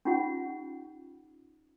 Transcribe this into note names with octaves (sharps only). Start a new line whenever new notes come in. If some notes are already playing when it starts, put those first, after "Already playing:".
C#4 D#4 F4 G4 F#5